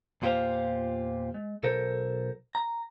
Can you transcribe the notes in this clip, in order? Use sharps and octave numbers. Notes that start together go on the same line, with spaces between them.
E2 A#2 F4 G4 C5 F5
G#3
B1 A4 A#4 C5
A#5